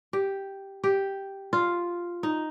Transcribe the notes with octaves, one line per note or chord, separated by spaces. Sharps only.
G4
G4
F4
D#4